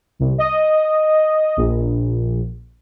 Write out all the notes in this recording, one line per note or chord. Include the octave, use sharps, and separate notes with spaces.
C2
D#5
A#1